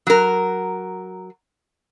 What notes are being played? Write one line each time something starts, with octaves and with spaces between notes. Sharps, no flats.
F#3 A#4